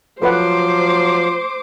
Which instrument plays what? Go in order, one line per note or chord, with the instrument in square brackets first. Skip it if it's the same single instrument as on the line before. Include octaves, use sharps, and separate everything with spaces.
[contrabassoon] F3 [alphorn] F#3 [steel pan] A4 B4 F#5 [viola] C5 D6